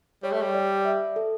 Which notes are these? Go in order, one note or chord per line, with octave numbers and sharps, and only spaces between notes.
G3 C#5
A3
G3
D5
D5
E5
A4